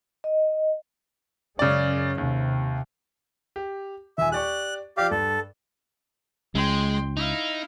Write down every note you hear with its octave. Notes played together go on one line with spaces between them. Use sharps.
D#5
F#2 C#3 G#3 C#4 D5
D#2 C3
G4
D#1 E5 G#5
G4 D5 C#6 F#6
F3 G4 D5 F5
G2 A4
C#2 G#3 G5 C6
D#4 E4 F5